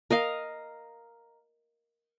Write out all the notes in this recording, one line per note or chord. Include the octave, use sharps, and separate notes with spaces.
A#4 D#5 F5